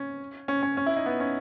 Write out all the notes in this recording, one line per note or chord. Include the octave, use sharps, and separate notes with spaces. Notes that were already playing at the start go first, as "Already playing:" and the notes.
Already playing: C#4
C#4
C#4
C#4
E4
D#4
B3
C#4